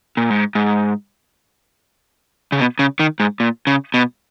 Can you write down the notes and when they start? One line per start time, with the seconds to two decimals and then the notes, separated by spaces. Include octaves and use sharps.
0.17 A#2
0.30 G#2
0.55 G#2
2.52 C#3
2.59 B2
2.79 C#3
3.00 D#3
3.20 G#2
3.40 A#2
3.67 C#3
3.94 B2